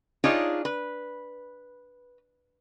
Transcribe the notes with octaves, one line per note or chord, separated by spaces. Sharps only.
D4 D#4 F4 G#4 C#5 D5
B4